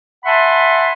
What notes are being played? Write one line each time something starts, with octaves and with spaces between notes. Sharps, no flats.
E5 F#5 G#5 A5 B5 C6